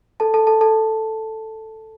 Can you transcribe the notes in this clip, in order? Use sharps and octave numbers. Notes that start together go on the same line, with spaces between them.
A4 A5
A4 A5
A4 A5
A4 A5